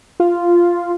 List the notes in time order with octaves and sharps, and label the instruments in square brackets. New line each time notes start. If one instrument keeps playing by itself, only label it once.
[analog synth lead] F4